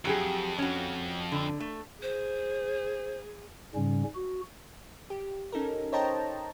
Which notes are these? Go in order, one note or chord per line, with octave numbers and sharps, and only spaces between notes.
F2 F#3 G4 G#4
C#4 F#4
D3
A3
G#4 C5
G#2 C#3 G3 C#4
F#4
G4
C#4 D#4 A4 A#4
C5 C#5 D#5 G5 A5 A#5